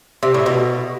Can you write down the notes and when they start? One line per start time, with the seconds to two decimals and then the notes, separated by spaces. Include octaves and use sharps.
0.23 C3
0.34 A2
0.46 B2